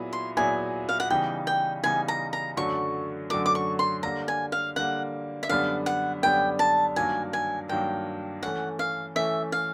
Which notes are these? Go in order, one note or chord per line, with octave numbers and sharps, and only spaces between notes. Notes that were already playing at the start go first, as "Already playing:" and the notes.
Already playing: A#2 F#3 B3 E4 G#4
C6
A#2 F#3 B3 E4 G#4 G#5
F5
F#5
C#3 E3 G3 B3 D#4 G5
G5
C#3 E3 G3 B3 D#4 G#5
A#5
A#5
F#2 D3 F#3 A3 C#6
F#2 D3 F#3 A3 D6
D6
C#6
C6
D3 G3 A#3 A#5
G#5
F5
D3 G3 A#3 F#5
E5
F#2 D3 G3 B3 D4 F5
F#5
F#2 D3 G3 B3 D4 G5
A5
G2 D#3 F#3 A#3 G#5
G#5
G2 D#3 F#3 A#3 G5
E3 A3 C#4 F#5
F5
E3 A3 C#4 E5
F5